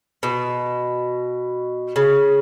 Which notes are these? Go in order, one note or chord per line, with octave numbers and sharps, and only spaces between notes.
B2
C#3